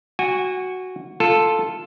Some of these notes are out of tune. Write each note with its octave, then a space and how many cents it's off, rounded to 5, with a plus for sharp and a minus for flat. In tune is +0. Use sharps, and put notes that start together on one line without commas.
F#4 +0 G#5 -30
F4 +0 A4 +0